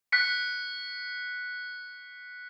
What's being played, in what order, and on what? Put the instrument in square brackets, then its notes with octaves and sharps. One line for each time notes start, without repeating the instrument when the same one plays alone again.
[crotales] F#6 B6 C#7